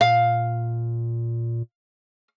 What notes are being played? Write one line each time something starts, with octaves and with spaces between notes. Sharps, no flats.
A#2 F5